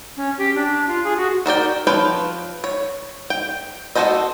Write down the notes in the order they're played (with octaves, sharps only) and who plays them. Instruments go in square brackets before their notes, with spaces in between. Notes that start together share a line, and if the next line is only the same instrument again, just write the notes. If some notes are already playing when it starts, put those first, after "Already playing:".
[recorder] C#4
G4
D4
F4
G#4
F#4
[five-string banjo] F#4 A#4 D5 G5
F3 B4 C#5 F5 G5
C#5
G5
F#4 G#4 A4 C5 D#5